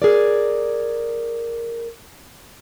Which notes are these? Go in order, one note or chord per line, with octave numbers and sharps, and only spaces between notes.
G#4 A#4 D5